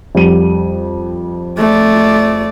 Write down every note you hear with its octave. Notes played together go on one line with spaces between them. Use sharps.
F2 G3 D#7
A3 D5